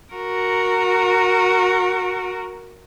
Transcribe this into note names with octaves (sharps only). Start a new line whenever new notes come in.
F#4 A#4